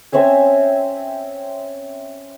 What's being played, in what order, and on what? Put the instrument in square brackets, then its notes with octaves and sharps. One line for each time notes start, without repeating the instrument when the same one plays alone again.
[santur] C4 C#4 E5 G#5